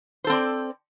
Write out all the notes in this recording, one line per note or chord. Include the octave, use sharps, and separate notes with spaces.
C4 A4 C5 D5